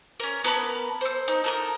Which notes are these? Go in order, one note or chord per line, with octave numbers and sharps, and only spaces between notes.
C#4 A#4
B3 A#4 A5 B5
C5 E6
D#4
A4 A#4 D#6